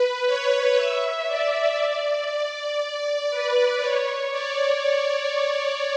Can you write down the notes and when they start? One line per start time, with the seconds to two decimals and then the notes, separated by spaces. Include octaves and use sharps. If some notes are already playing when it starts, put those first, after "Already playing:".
Already playing: B4
0.26 C#5
0.76 E5
1.27 D5
1.78 D5
3.31 B4
3.81 C#5
4.32 D5